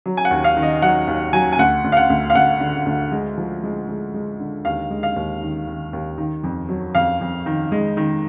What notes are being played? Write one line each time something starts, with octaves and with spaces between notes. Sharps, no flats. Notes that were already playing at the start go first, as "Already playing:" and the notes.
F#3
G#5
F#5
D#2
F5
D#3
D#5
F#3 F#5
D#2
F#3 G#5
G#5
D2 F#5
D2
F5
F#5
D2
F5
D2 F#5
D3
D2
G#3
F3
G#3
G#3
G#3
D3
D#2 F5
G#3
F5
D#2
D#3
D#3
D#2
D#3
F2
F#3
F2 F5
F2
D#3
G#3
D#3